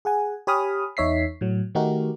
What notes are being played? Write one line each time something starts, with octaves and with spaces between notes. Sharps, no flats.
G#4 F#5 G#5
G4 C#5 G#5 B5 D#6 F6
E2 D#4 C#5 E5 B6 C7
A2 F#3
D#3 A3 D#4 F#4 G4 A#4